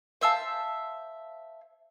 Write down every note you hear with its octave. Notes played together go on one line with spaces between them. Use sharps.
C5 E5 F5 A5